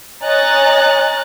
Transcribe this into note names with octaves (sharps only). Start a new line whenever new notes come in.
C#5 D#5 G#5 A#5 F#6 A6